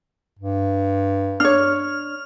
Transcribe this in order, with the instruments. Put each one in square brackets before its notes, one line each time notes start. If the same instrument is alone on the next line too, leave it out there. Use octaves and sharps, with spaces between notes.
[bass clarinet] G2
[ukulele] D4 C#5 [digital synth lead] F6